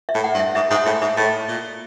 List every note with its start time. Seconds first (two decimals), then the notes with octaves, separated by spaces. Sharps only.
0.09 E5
0.14 A2
0.24 F#5
0.34 G2
0.39 E5
0.55 G#2 E5
0.70 G#2 E5
0.86 A2 E5
1.01 G#2 E5
1.17 A2 D#5
1.48 A#2